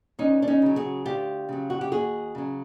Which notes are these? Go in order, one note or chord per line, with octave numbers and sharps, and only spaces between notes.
D2 C#4 D#4
D4
C#4 D#4
C#3 F#3
F#4 G#4
D2 F4 G4
C#3 F#3
F#4
G4
D#2 F#4 G#4
C#3 F#3